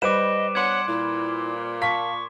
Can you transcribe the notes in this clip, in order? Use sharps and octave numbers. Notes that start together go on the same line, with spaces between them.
G3 B4 C5 D#5 D6 D7 E7
B3 D4 C#5 F#5 C6 G#6
A#2 E4
F5 A5 C#6 B6